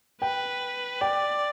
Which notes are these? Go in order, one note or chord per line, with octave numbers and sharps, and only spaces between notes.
B4 G5
D5 G5